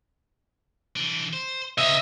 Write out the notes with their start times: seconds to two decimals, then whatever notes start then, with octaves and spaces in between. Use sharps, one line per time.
0.96 E3 D4
1.33 C5
1.78 C#3 D#5 E5 A#5